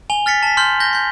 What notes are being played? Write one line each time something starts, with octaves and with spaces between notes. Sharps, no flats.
G#5 F7 G7
F6 A6 B6 C#7
A5 B6
C6 F6 G6 F#7
G6 A#6 G7
C6 G6